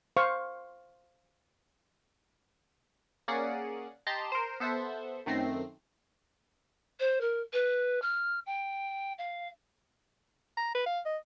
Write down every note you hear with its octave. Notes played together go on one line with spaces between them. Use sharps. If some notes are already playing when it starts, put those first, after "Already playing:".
C5 F5 C#6
A#3 C#4 G#4 D5 F#5
G4 D#5 A5 A#5 C6
A#4 C5
B3 A4 C5 E5 F#5
F#2 D#3 A3 C4 A#6 C7
C5
A#4
B4
F6
G5
F5
A#5
B4
F5
D#5